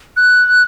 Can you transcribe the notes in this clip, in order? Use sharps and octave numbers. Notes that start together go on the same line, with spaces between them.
F#6